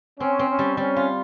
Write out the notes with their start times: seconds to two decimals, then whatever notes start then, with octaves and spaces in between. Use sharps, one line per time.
0.20 C4 C#4
0.39 C4
0.49 C#4
0.59 G3
0.77 G3 C#4
0.96 F4